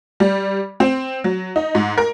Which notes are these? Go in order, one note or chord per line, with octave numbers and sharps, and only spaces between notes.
G3
C4
F#3
D#4
G#2
A#4